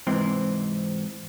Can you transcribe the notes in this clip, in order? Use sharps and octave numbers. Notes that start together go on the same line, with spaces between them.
G#2 C3 E3 C4